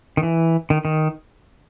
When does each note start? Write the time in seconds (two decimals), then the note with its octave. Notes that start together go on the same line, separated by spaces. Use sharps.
0.17 D#3
0.23 E3
0.70 D#3
0.85 D#3